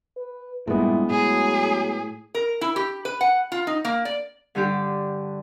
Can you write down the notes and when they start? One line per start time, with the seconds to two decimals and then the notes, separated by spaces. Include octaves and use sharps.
0.17 B4
0.67 A1 G2 A#2 G#3 B3 E4
1.10 A2 F#3 G#4
2.35 A#4
2.61 E4
2.76 G4
3.05 B4
3.21 F#5
3.52 F4
3.67 D#4
3.85 A#3
4.05 D5
4.55 G2 D3 D4 G4